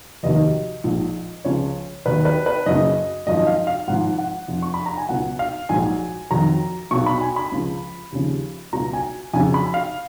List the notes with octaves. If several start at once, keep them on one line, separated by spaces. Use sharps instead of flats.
F1 D#2 D#3 F#3 D#5
A#1 G#2 F3
C#2 C#3 F3 C#5
D#2 D#3 F#3 B4
B4
B4
F#1 F#2 C#3 D#5
G#1 F#2 F3 D#5
F5
F5
G#1 G#2 F3 F#5
F#5
F2 F3
C#6
B5
A#5
G#5
C#2 B2 F#3 F#5
F5
A#1 G#2 F#3 G#5
F2 D#3 F#3 A#5
B1 B2 F#3 C#6
B5
G#5
B5
C#2 C#3 F3
D#2 C#3 F3
C#2 B2 F#3 A#5
G#5
F2 C#3 F#3 G#5
B5
F5